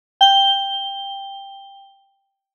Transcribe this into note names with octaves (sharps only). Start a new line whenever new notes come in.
G5 G7